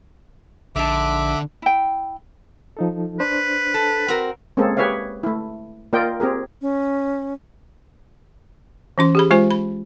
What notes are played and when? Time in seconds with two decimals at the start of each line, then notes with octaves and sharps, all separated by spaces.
0.76 A#1 G#2 D3 E5 A5 D6
1.62 E4 G5
2.77 F3 D#4 A4
3.20 D4 B4 C5
3.74 A4
4.08 C4 F#4 A#4
4.57 G#3 A#3 C4 C#4 G#4 A4
4.77 G4 G#4 B4 C#5 E5 F5
5.23 A3 E4
5.93 A#3 F4 A#4 D5 D#5 G5
6.20 C4 G4 G#4 A#4
6.61 C#4
8.98 E3 C#4 C6
9.15 G4 G#4 B5
9.31 G#3 F4 C5 G#5
9.51 B5